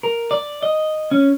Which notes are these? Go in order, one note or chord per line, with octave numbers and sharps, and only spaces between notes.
A#4
D5
D#5
C#4